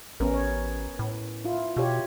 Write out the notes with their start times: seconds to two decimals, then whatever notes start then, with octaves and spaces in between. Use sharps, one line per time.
0.20 A1 B3 C#4 A#4
0.34 C#5
0.99 A2
1.45 E4 F4
1.77 B2 F4 G4 C#5